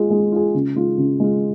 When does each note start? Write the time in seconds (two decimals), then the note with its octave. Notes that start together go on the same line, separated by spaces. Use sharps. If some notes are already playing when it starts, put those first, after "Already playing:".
Already playing: G#3 F4 G#4
0.10 G#3
0.32 F4 G#4
0.54 C#3
0.76 G#3 F4
0.98 C#3
1.20 G#3 F4